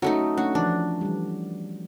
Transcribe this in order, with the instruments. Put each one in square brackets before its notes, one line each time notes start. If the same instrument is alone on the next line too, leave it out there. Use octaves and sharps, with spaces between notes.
[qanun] F#3 A3 D#4 [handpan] C#4 F#4 A4
[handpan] A3 C#4 D4 [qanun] F#4
[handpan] E3 F3 [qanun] D4
[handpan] E3 G3